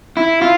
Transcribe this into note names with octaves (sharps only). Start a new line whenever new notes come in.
E4
F4